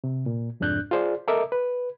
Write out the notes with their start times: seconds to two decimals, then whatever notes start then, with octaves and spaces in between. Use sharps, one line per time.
0.04 C3
0.26 A#2
0.60 C2 F2 G#2 D4 F#6 G6
0.91 F4 G#4 C5 D5
1.28 A4 A#4 D#5 E5 D6
1.52 B4